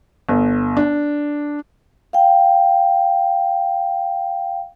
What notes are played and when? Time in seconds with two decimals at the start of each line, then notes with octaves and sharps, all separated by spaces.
0.29 G1
0.77 D4
2.13 F5 G5